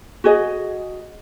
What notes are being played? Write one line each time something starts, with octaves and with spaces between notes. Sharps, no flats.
F#4 G#4 D#5